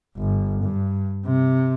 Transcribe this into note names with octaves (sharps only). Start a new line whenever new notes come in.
G1
G2
C3